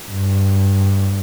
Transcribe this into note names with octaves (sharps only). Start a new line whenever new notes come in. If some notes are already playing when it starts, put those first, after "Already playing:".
G2